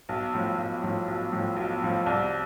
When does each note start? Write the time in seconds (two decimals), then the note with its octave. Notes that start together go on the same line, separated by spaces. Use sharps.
0.09 B1
0.34 A2 F3
0.58 B1
0.82 A2 F3
1.08 B1
1.32 A2 F3
1.56 B1
1.82 A2 F3
2.06 C2